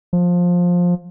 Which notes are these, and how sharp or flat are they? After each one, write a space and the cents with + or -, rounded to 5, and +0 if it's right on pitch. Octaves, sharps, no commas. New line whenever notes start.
F3 +15